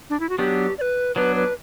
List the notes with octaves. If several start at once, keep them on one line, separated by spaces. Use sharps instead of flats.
D4
E4
F#4
F#3 B3 D4 G4
D5
B4
F#3 B3 D4 B4
B4